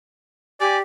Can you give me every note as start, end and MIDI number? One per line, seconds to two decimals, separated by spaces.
0.60 0.81 67
0.60 0.78 74
0.60 0.77 80